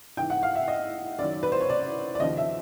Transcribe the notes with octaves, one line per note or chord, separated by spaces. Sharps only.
G#2 E3 G5
F#5
F5
E5
D#5
F#2 D#3 F#3 D5
B4
C5
C#5
D5
D5
D#2 C#3 F3 D#5
E5